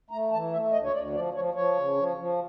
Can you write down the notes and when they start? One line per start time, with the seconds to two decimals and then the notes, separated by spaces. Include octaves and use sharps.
0.10 A3 A#5
0.32 E3 A5
0.51 A3 E5
0.72 D2 D#5
0.83 C#5
0.93 D2 D5
1.13 F3 D5
1.33 F3 C#5
1.54 F3 C#5
1.76 C#3
1.96 F3
2.17 F3